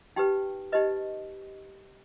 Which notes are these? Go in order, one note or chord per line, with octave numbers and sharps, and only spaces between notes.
D#4 G4 B4 G5
D#4 G4 B4 D#5